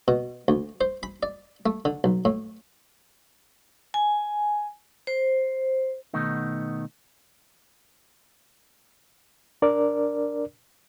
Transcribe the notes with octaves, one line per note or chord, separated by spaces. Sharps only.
B2
D2
C5
B5
D5
A3
D3
B1
A2
G#5
C5
B2 D#3 A3 B3 D#4
D4 A#4 D5